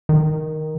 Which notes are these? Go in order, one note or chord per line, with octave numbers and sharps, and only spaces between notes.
D#3